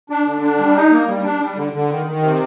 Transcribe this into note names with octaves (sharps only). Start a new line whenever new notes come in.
D4
D3
D4
G3
D#4
A#3
G3
D4
G3
D3
D3
D#3
D#3
C3